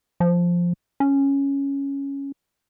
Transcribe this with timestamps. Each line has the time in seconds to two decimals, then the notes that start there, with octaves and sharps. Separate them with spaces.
0.20 F3
1.00 C#4